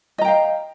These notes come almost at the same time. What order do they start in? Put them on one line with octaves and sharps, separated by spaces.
D#5 A#5 G5 F5